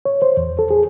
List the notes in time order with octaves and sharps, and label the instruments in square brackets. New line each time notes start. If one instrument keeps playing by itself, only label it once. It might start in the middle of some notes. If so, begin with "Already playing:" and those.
[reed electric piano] C#5
C5
E2
A4
G#4